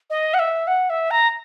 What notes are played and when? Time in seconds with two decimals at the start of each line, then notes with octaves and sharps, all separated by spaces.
0.10 D#5
0.34 F#5
0.39 E5
0.67 F#5
0.90 E5
1.11 A#5